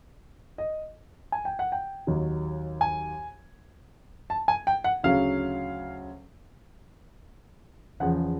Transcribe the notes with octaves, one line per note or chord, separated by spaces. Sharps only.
D#5
G#5
G5
F#5
G5
D#2 D#3 F#3
G#5
A5
G#5
G5
F#5
D2 C#3 F#3 F5
E2 C#3 F3 F#5